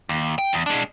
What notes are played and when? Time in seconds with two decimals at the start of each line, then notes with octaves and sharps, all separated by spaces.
0.09 D#2
0.38 G5
0.53 E2
0.66 G#3 D4